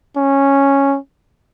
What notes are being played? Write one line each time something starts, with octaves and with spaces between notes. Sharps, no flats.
C#4